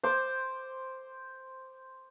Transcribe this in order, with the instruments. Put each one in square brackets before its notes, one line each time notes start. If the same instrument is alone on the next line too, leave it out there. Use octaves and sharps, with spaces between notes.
[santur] C5 D6